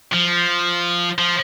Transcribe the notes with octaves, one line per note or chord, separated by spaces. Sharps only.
F3
F3